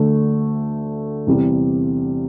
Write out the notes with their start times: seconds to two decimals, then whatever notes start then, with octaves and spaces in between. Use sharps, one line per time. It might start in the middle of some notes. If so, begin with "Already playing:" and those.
Already playing: D2 D3 A3
1.26 E2 C3 G3